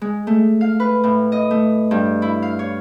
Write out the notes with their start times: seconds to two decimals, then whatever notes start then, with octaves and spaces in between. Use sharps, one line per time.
0.01 G#3
0.27 A3
0.61 F5
0.80 B4
1.04 A2
1.32 D#5
1.51 A3
1.91 G2
2.22 E4
2.42 F5
2.59 C#5